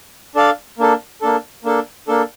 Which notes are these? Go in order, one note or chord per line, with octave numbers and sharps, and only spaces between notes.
D4 A4 D5 F5 A5
A#3 D4 A4
A#3 D4 A4
A#3 D4 A4
A#3 D4 A4